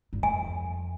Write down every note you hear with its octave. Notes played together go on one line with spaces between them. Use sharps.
G2
F2 G#5